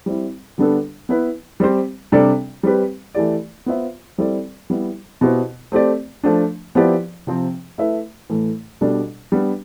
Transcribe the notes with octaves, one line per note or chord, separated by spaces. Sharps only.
G3 C4 E4
D3 G3 B3 D4 A4
B3 E4 B4
G3 C4 G4 C5
C3 G3 D4 A4 D5
G3 C4 G4 B4
E3 A3 E4 G4 D5
B3 F4 C5 E5
G3 C4 E4 A4 D5
G3 B3 E4
B2 B3 E4 G4 C5
A3 C4 G4 D5
F3 A3 D4
F3 B3 E4 G4 D5
C3 F3 C4
A3 E4 B4 E5
A2 E3 A3
B2 G3 D4 A4 D5
G3 B3 D4